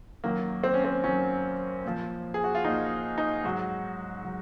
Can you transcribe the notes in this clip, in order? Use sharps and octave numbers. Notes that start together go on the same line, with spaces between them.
F#2 D#3 F#3 A#3
C4
C#4
C4
F#2 D#3 F#3 C#4
A#2 F3
G#4
F#4
F4
A#2 F3 D#4
D#4
G#2 F#3 F#4
F#3